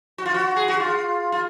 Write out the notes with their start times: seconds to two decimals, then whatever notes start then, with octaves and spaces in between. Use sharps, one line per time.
0.18 F#4
0.26 F4
0.34 F#4
0.56 G#4
0.68 F#4
0.80 F4
1.32 F4